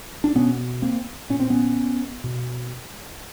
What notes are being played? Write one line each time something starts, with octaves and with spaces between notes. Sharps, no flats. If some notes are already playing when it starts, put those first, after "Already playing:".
D4
B2 B3 C#4
A#3 C4
A#2 C#4
C4
B3 C#4
B2